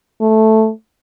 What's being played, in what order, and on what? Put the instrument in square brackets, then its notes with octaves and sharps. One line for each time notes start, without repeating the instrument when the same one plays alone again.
[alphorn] A3